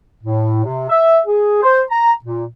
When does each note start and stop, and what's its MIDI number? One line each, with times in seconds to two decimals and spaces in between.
0.24 0.63 45
0.65 0.87 48
0.90 1.19 76
1.26 1.63 68
1.63 1.81 72
1.90 2.11 82
2.23 2.45 46